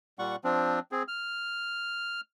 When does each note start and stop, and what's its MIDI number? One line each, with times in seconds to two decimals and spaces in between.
0.19 0.36 46
0.19 0.36 55
0.19 0.36 78
0.19 0.36 85
0.44 0.79 53
0.44 0.79 60
0.44 0.79 62
0.92 1.03 60
0.92 1.03 68
1.08 2.21 89